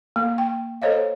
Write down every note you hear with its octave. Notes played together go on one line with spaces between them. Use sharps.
A#3
G5
A4 C5 C#5 D#5 F5